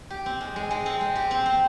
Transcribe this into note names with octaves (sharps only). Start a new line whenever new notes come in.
G4
C4
G#3
G#3
G#3
C4
G#3
G4
C4
C4